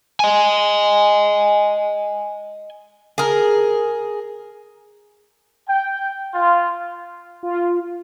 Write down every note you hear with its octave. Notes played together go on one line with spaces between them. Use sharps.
D#5 G#5
G#4 A#4
G5
F4
F4